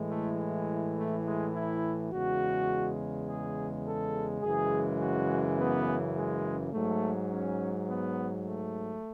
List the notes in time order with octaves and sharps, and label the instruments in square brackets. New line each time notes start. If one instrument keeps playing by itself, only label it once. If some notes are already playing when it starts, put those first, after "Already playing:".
Already playing: [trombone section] A2 E3 G#3
A3
A3
G#3
E4
E2 C#3 G#3 F#4
G#4
A4
F#2 C#3 E3 G#3 G#4
F#4
B3
G#3
G#2 F#3 A3
C#4
B3
A3